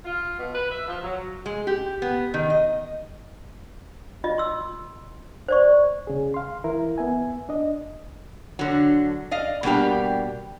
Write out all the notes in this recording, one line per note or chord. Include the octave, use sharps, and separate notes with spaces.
F4
B2
B4
E5
F3
F#3
G#3
G4
B3
D#3
D#5
F4 D#5
C6 E6
C5 D5 C#6
C#3 G#4
F5 C6
E3 E4 A#4 E5
B3 E5 G#5
D4 D#5
D3 F#3
D5 D#5 F5
B2 G3 A#3 D4 G4